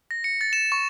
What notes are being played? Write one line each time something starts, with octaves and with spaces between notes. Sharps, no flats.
A#6
C#7
A6
E7
C#6